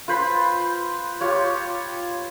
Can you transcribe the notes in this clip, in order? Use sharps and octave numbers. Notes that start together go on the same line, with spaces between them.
F4 B4 C5 B5
F4 G4 C#5